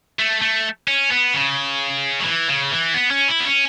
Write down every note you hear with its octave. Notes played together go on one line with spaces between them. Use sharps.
A3
A3
C#4
B3
C#3
F#3
E3
C#3
E3
B3
C#4
E4
B3
C#4